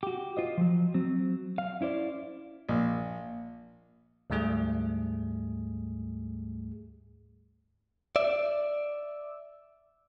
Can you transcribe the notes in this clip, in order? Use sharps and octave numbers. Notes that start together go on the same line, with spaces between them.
F#4 G4
F4 C5 D#5
F3 F#3
F#3 C4
F5
C#4 E4 C5 D5
A#1
D2 G#2 G3 A3 G#4
D5 E5